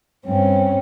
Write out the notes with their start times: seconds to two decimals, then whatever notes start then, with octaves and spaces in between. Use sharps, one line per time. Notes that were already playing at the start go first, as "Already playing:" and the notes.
0.25 G2 C4 C#4